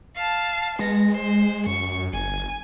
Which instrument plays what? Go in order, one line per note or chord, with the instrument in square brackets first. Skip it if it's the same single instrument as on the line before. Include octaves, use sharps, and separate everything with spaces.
[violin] F5 A5
[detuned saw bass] G#3 [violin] B3 A#6
[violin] C5
[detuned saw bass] F#2 [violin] C#6
[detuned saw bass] G1 [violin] G#5